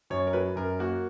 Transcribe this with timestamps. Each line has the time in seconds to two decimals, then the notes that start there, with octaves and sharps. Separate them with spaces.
0.10 F#2 C#5
0.27 A#4
0.33 F#3 B4
0.56 F#2 A#4
0.79 A#3 F#4